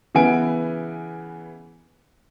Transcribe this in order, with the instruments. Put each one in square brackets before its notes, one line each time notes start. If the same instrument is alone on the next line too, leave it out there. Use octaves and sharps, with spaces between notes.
[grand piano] C#3 E3 B3 G#5 D7